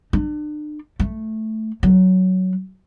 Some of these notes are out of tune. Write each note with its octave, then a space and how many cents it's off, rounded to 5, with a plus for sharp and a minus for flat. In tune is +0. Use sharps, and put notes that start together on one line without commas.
D4 +40
A3 -5
F#3 +10